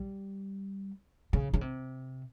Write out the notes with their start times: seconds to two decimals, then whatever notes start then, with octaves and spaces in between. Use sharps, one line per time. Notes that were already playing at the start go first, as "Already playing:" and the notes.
Already playing: G3
1.33 C#3
1.54 C#3
1.61 C3